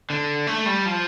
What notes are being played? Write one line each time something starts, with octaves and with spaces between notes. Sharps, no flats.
D3
A3
G3
F3